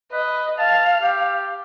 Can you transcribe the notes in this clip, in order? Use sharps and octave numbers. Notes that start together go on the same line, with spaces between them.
B4 D#5
F5 A5
G4